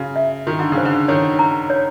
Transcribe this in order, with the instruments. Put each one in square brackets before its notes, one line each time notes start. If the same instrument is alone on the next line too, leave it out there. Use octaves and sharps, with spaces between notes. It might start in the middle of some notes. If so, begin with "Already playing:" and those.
Already playing: [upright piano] C#3 [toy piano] F#4
[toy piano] E5
[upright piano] D#3 [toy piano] F#4
[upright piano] D3
C#3
[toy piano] C5
[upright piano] D3
[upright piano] D#3 [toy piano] C#5
[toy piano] A#5
C#5